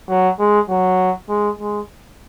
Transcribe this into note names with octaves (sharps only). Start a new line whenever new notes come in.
F#3
G#3
F#3
G#3
G#3